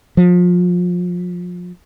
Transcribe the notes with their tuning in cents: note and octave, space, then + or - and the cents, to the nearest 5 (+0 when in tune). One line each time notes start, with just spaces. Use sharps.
F3 +30